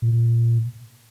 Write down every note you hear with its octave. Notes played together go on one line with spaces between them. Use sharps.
A#2